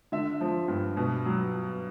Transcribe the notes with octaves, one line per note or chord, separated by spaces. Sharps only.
D3 E5
F3
G2
B2
F#3